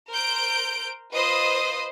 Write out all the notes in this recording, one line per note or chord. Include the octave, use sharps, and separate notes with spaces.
A#4 C5 G6 D7
F4 B4 C5 D#5 D#6